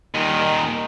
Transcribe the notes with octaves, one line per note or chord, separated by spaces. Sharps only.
D#2 A#2 D#3